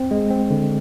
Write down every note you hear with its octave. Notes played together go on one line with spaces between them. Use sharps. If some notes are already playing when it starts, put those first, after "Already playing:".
Already playing: C4
G#3
C4
D3